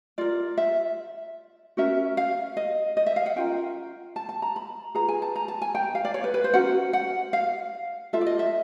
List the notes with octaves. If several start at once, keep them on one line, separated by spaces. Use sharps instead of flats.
F4 A#4 D5
E5
C#4 F#4 A#4 E5
F5
D#5
D#5
E5
F5
F#5
C#4 F4 A#4 G5
A5
A5
A#5
B5
F4 G#4 B4 A#5
G#5
A5
A#5
A5
G#5
G5
F5
D5
C#5
B4
B4
C5
C#4 F#4 A#4 F#5
F#5
F5
F4 A4 E5
D5
D#5
E5